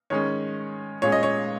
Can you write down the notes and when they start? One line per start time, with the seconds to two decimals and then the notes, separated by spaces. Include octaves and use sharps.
0.10 D#3 G#3 C#4 C#5
1.02 A#2 G#3 C#4 C#5
1.12 D#5
1.23 C#5